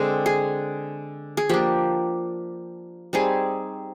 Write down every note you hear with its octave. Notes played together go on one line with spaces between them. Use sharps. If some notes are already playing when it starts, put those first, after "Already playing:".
Already playing: D3 G#3 C4 G#4
G#4
G#4
F3 A#3 D4 G4
G3 C4 D#4 G#4